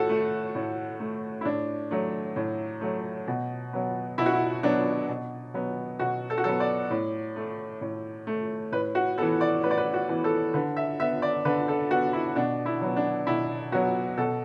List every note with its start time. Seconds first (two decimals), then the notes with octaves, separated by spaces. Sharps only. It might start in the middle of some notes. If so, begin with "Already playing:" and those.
Already playing: A2 F#4 A4
0.09 A3
0.55 A2
1.00 A3
1.41 E4
1.45 A2 D4
1.91 F#3 A3
2.36 A2
2.81 F#3 A3
3.27 B2
3.73 F#3 B3
4.18 B2 E4
4.26 F#4
4.33 E4
4.63 F#3 B3 D4
5.09 B2
5.54 F#3 B3
5.99 B2 F#4
6.30 A4
6.38 F#4
6.44 F#3 B3 A4
6.60 D5
6.91 A2
7.36 A3
7.81 A2
8.27 A3
8.72 A2 B4
8.95 F#4
9.18 E3 B3 A4
9.41 D5
9.63 A2 B4
9.71 D5
9.78 B4
9.94 F#4
10.09 E3 B3
10.24 A4
10.54 D3 B4
10.76 E5
11.00 B3 E5
11.22 D5
11.45 D3 B4
11.68 A4
11.91 B3 F#4
12.13 E4
12.36 B2 D4
12.66 E4
12.82 F#3 B3
12.96 D4
13.27 B2 E4
13.72 F#3 B3 F#4
14.18 B2 A4